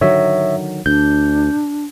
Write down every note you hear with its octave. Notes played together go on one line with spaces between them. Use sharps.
D3 D#3 F#3 C#5 E5
D2 D4 G6